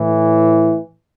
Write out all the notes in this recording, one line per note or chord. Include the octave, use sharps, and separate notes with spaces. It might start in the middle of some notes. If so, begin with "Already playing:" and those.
Already playing: A2 E3